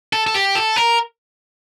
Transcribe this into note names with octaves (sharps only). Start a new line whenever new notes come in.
A4
A4
G4
A4
A#4